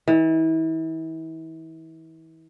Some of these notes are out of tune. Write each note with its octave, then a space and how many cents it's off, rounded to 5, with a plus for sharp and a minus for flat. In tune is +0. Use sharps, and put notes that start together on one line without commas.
E3 -35